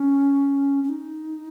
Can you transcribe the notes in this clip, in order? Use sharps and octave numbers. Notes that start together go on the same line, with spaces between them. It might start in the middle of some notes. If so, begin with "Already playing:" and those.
Already playing: C#4
C#4
D#4